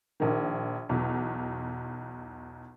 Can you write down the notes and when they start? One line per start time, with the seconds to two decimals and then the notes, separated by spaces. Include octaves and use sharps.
0.20 A#1 D#3
0.89 B1 E2